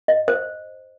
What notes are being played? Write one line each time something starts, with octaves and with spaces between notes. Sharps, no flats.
D#5
C5